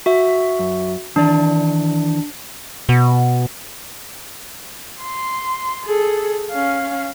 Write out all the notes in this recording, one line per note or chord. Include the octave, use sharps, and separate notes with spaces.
F#4 E5
F#2
D#3 E3 D4 D5
B2
C6
G#4 A4
C#4 F5